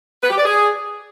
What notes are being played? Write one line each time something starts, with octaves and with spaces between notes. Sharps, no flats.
B4
G4
D5
G#4